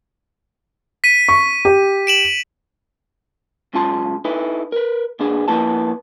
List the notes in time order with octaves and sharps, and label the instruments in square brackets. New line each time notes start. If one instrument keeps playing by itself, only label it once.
[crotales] B6 D#7
[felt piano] C#6
G4
[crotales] D7 E7 F#7
[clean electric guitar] B1 C#3 G#3 F4 A5 C6
D#4 E4 A4 B4
A#4 B4
A#2 B3 D4 G#4
F3 A#3 B3 E4 B4 A5